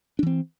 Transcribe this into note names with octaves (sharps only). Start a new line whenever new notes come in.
E3 C4 D4